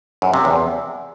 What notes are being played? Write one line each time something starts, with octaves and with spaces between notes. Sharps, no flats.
F#2
C3
E2